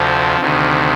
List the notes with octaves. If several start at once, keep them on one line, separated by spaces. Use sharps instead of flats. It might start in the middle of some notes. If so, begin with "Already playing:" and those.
Already playing: D2 C3 F3
D2 C3 D#3